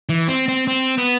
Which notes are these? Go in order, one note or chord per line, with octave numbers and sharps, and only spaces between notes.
E3
C4
C4
C4
B3